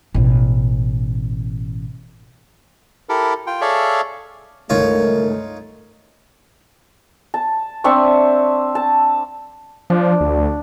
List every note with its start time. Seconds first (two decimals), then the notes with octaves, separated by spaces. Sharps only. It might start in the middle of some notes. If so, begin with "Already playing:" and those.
0.14 A1 B2
3.09 E4 G4 A4 A#4
3.47 F4 G5
3.61 G#4 A4 C#5 D5 E5 F5
4.70 G1 C#2 D#3 A3 D#4 F4 A#4 C#5
7.34 A5
7.84 C4 D4 E5 C#6
8.75 A5
9.90 F3 D4
10.21 D2